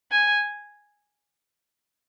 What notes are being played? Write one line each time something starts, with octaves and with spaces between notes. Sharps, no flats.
G#5